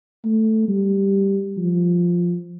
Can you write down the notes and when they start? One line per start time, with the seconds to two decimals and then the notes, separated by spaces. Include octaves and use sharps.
0.25 A3
0.69 G3
1.57 F3